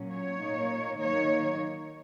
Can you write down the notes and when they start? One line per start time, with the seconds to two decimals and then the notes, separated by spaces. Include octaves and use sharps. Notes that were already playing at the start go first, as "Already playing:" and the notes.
Already playing: A#2 F#3 C#4
0.13 C#5
0.42 A#2 A#3 D#4
0.99 D#3 F#3 A#3 D#4 C#5